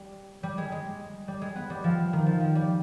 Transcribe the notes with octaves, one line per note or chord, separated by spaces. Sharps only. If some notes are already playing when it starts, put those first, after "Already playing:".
Already playing: G3
G3
G#3
G#3
G3
G#3
B3
G3
F3
D#3
F3
F3
G3